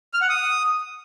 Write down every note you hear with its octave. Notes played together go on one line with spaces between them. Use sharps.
F6
F#5
D#6